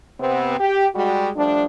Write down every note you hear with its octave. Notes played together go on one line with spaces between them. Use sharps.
C3 B3 C4
G4
G3 G#3 F#4
F3 G3 A3 D4